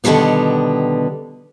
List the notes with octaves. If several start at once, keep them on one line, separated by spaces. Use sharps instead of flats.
B2 D3 D#3 F#3 G3 B3